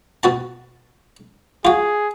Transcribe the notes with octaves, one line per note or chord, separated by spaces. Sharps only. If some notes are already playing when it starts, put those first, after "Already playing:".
B2 F#4 A5
F4 F#4 G#4